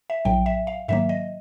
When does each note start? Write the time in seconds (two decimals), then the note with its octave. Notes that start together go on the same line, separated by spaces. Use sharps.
0.10 E5
0.25 A#1 A2 F#3 G5
0.46 E5
0.67 F5
0.88 G#2 D#3 F#3 A#3 E5
1.09 D#5